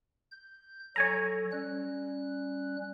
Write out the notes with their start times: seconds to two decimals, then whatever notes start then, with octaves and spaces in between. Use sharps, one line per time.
0.31 G6
0.96 F#3 A4 C#5 G#5 A#5
1.52 G3 C#4 F#6